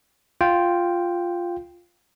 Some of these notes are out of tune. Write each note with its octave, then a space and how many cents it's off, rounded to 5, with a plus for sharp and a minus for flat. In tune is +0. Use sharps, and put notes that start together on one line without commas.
F4 +0 G5 +0